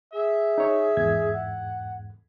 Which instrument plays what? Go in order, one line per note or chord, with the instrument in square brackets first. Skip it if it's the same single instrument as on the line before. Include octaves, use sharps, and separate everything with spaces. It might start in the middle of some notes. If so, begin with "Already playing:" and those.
[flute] G#4 [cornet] E5
[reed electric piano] D#4 C#5
E2 G#2 G#6
[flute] F#5